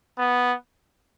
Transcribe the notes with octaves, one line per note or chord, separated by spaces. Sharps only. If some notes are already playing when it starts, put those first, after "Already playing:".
B3